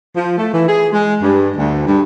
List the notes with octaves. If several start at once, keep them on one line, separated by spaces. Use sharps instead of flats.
F3
A3
E3
G#4
G#3
G2
D2
G2